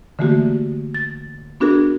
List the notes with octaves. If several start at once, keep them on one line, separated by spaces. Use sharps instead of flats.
D3 E3 A3 A#3 F#4 G4
A6
B3 D4 F#4 G#4 A#4